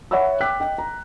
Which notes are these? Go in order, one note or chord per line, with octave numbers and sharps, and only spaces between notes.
C#5 E5 F#5 B5 E6
G5 D6 E6 F#6 B6
D#5 G5
A#5